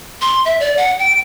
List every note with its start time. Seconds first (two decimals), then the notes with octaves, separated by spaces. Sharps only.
0.21 C6
0.45 E5
0.60 D5
0.77 F#5
0.99 G5